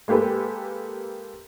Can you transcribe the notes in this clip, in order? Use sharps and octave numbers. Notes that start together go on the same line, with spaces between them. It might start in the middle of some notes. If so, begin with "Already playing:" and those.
G#3 A#3 G4 A4 B4